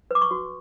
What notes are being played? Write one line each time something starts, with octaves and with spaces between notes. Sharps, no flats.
B4 D6
C#6
F#4